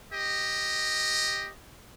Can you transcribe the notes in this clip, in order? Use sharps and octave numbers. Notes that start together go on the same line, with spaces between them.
G4 D#5